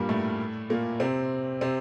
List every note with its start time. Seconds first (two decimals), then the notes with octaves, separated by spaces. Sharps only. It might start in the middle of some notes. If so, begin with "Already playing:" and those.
Already playing: G2 A#2 G3 A#3
0.09 A2 A3
0.70 A#2 A#3
1.00 C3 C4
1.61 C3 C4